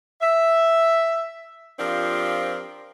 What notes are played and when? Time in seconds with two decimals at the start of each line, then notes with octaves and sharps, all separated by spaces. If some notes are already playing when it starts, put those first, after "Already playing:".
0.22 E5
1.79 F3 C4 D4 F4 G4 A#4